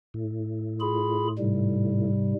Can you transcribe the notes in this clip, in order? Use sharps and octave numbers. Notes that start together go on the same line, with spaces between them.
A2
F4 G#4 B5
G#2 C3 G3